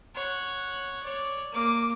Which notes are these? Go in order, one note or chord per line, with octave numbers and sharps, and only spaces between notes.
C#5 F#5
C#5 D5
A#3 D6